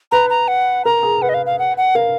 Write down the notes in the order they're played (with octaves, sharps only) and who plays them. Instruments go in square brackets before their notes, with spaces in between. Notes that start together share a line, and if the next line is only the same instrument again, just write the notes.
[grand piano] B4 [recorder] A#5
[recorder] A#5
F#5
[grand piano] A#4 [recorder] A#5
[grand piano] G#4
[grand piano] B4 [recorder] F#5
[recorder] D#5
F5
F5
F#5
F#5
[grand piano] A#4 [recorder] F5